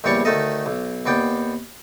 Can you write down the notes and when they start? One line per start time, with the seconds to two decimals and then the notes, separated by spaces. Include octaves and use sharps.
0.04 A#1 E2 G3 C#5 D5 C#6
0.25 D2 D#3 A3 A4 D#5
0.66 B1
1.06 D#2 B3 D5 G5